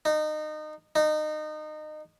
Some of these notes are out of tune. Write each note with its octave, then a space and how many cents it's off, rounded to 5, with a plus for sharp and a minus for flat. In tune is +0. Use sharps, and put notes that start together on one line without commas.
D#4 -25
D#4 -25